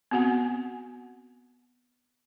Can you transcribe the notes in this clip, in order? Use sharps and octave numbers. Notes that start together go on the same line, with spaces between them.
B3 C4 F#4 F#5 G#5